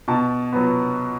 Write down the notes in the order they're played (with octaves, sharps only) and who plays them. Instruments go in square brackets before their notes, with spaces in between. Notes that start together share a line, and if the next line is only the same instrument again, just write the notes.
[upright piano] B2 A5
F#3 B3